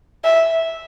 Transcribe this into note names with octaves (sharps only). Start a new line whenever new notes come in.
E5